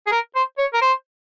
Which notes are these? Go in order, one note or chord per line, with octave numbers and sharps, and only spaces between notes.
G#4
A#4
C5
C#5
A#4
C5